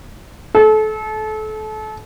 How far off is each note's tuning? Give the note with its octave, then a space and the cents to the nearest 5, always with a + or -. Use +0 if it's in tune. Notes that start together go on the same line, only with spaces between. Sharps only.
A4 -30